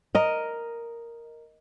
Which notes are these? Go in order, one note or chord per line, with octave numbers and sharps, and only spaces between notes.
A#4 D#5